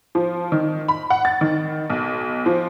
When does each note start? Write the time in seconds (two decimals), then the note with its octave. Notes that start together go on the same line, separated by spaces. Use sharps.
0.15 F3
0.52 D#3
0.88 B5
1.10 F#5
1.25 A6
1.41 D#3
1.90 B1
2.46 F3